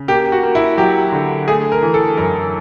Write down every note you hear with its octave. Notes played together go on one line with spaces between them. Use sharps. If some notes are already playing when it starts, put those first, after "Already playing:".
Already playing: C#3
A#3 G4
F#4
A#3
E4
F#3 G4
D3
A3 G#4
A#4
E3
A4
F#2 A#4